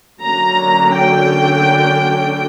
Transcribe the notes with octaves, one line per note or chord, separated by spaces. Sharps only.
D3 F#3 A#3 C#4 A#5
G5